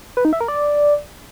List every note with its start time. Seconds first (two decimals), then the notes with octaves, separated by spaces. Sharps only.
0.17 B4
0.25 D#4
0.33 E5
0.41 A#4
0.48 D5